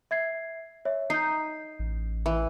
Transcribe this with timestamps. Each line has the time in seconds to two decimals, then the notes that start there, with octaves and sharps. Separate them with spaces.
0.11 E5 G#6 C7
0.85 C#5 E5
1.10 D#4 G6 C7
1.79 A1
2.26 E3